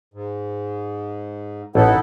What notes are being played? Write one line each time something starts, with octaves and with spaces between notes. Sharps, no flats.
G#2
A1 D#4 E4 A4 F#5